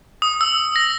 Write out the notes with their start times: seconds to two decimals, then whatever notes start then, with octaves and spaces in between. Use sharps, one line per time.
0.22 D#6
0.41 E6
0.76 A#6